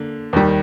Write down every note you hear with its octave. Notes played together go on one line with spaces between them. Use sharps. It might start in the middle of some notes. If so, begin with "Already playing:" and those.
Already playing: D3 A#3
D#2 D#3 G3